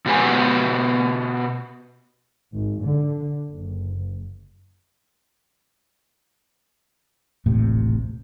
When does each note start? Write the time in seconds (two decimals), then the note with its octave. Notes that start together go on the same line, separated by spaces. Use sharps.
0.06 B2 F#4 G4 B4 G#5
2.52 G#1
2.82 D3
3.50 F#1
7.46 D#1 A1 A2 C3